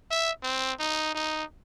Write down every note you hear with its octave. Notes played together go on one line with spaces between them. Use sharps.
E5
C4
D#4
D#4